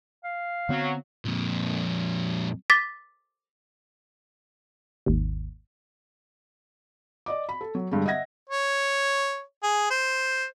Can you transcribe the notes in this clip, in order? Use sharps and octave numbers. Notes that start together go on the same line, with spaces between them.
F5
D3 F#3 B3 C4
F2 A#2
D6 A6 B6
G#1 D#2
D5 D#5 D6
B5
A4
F#3
G2 D3 G#3
D#5 E5 F#5 G#6 A#6
C#5
G#4
C5